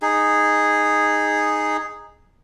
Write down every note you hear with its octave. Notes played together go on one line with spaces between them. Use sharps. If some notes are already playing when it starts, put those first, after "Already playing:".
D#4 G#4